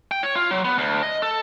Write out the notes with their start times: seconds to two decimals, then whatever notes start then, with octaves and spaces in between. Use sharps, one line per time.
0.11 G5
0.23 C#5
0.36 F4
0.51 F#3
0.65 B3
0.78 D2
1.03 D#5
1.22 A4